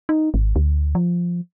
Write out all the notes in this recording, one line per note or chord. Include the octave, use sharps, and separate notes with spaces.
D#4
G#1
D2
F3